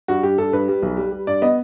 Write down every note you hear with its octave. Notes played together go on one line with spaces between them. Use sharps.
G2 F#4
G2 G4
G2 A4
G2 B4
G3
B1
G3
G3
G2 D5
B3 D#5